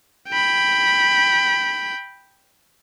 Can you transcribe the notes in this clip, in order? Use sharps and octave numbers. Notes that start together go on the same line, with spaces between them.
G5 B5